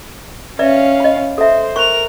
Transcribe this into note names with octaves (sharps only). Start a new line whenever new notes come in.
C#4 B4 D5 E5 F5
D#5 B5
A4 C5 E5
A#4 C5 C#6 F7